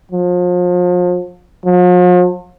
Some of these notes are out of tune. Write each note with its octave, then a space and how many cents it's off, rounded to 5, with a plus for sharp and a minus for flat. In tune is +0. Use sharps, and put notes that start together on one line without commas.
F3 +35
F3 +45